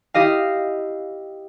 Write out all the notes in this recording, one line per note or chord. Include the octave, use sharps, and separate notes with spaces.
E4 G4 D#5 F5